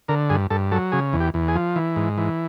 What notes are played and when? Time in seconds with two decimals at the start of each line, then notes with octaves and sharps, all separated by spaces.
0.08 D3 A#4
0.30 G2 G#4
0.50 G2 A4
0.72 F#3 A4
0.92 C#3 G#4
1.13 E2
1.20 G4
1.34 E2
1.48 G#4
1.55 F3
1.76 E3
1.96 G#2
2.18 E3